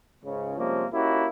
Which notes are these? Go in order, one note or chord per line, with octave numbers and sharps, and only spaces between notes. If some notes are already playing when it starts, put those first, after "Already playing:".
C#2 G#2 C#3
C3 F3 G3 G#3 A#3 C#4
A#3 C#4 D#4 E4 F#4 G4